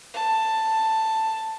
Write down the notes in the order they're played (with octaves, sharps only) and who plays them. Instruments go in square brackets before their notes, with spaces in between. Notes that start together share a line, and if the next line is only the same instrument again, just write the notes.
[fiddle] A5